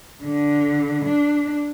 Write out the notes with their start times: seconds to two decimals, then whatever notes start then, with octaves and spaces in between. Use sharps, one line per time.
0.23 D3
1.05 D4